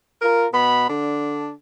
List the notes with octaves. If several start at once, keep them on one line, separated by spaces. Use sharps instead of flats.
F4 A#4
B2 B3 B5
D3 D4